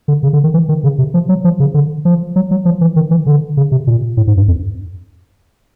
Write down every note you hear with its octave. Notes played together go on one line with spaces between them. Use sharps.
D3
C#3
D3
D#3
E3
D#3
C#3
C3
F3
F#3
F3
C#3
D3
F3
F#3
F#3
F3
E3
D#3
E3
D3
C#3
C3
A#2
A2
G#2
G2
F2